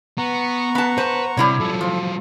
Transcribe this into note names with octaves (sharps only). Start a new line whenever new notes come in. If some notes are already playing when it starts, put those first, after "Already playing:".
B3 F#5 A#5 C#6
B3 A5
B4 C5
C3 G3 E4 C#5
F#3 F4 A4
F3